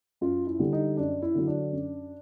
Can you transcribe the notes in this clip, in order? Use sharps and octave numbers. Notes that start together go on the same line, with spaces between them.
F#2 F4
E4
D3 G3
D#4
F#2 D4
E4
D3 F#3
D4
F#2